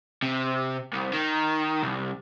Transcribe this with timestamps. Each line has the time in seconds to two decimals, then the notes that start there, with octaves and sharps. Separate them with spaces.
0.23 C3
0.93 C2
1.13 D#3
1.82 C2